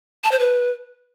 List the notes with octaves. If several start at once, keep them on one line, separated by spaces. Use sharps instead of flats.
A5
C5
B4